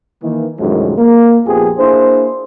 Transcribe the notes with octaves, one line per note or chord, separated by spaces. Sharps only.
D#3 E3 A#3
C2 F#2 A2 D#3 F3 G#3
A#3
A#1 F2 F3 B3 G4 G#4
A#3 D4 E4 G#4 C5